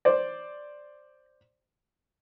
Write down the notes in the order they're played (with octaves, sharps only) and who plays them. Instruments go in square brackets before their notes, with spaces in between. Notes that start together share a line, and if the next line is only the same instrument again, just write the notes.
[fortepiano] C5 D5